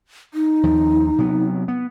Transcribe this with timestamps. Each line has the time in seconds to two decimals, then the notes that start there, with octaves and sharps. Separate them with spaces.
0.34 D#4
0.63 D#2 F3
1.18 C3 F#3 B3
1.68 B3